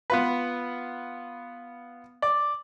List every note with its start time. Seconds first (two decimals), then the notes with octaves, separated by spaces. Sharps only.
0.10 B3 F4 B4
2.22 D5